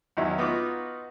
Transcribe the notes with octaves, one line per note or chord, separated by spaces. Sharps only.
E2 D#3 F#3 E4
B3 D#4 F4 F#4 D6